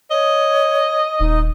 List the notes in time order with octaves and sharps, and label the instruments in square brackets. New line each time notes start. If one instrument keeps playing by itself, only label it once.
[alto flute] C#5 [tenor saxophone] D#5
[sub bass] D#1 [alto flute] D#4